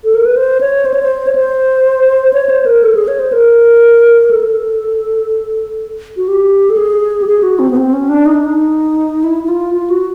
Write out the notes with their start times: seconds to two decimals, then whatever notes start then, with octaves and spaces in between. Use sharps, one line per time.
0.04 A4
0.15 A#4
0.25 B4
0.37 C5
0.61 C#5
0.85 C5
0.94 C#5
1.03 C5
1.27 C#5
1.35 C5
2.33 C#5
2.49 C5
2.66 A#4
2.83 A4
2.95 G#4
3.08 C#5
3.19 C5
3.32 A#4
4.31 A4
6.17 F#4
6.28 G4
6.70 A4
6.77 G#4
7.22 G4
7.27 G#4
7.43 F#4
7.59 C4
7.71 B3
7.76 C4
7.93 C#4
8.09 D4
8.26 D#4
8.34 D4
8.44 D#4
9.24 E4
9.44 E4
9.48 F4
9.74 F4
9.90 F#4